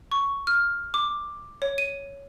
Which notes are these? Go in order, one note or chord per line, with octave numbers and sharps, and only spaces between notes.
C#6
F6
D6
C#5
D#7